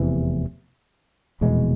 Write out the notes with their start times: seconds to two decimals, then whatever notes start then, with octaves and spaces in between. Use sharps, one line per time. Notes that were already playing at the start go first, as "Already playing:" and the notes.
Already playing: F1 E2 C3 E3
1.41 F1 E2 B2 G#3